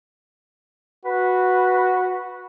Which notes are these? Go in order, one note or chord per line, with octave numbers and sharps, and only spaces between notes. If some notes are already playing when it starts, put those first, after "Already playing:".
F#4 B4